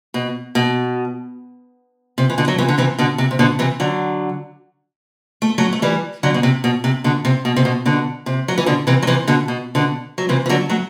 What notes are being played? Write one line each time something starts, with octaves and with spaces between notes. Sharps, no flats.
B2
B2
C3
E3
B2 D3
F#3
C3 E3
D3
C3 E3
B2 D3
C3
C3
B2 D3
C3 E3
D3 F#3
A3
F#3 A3
A3
E3 G3
D3 F#3
B2
C3
B2
C3
B2 D3
C3
B2
C3
B2
B2 D3
C3
F#3
E3
B2 D3
C3 E3
F#3
C3 E3
B2 D3
B2
B2 D3
F#3
C3 E3
E3
D3 F#3
F#3 A3